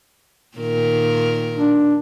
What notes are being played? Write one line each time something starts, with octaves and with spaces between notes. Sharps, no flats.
A#2 D#3 A#4
D4